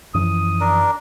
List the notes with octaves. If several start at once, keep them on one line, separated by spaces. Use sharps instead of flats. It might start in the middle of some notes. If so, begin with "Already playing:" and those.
F#2 E3 F3 D#6
D4 A#4